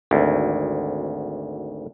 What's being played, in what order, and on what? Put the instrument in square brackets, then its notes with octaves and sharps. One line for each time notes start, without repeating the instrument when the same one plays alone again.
[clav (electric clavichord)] G#1 D2